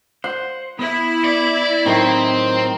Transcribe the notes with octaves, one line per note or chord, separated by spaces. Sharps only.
C5 F#5
B3 E4
D5
A2 D#3 F#3 C4